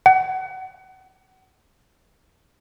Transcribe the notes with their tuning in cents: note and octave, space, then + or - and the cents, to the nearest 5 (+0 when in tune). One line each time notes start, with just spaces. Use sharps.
F#5 +30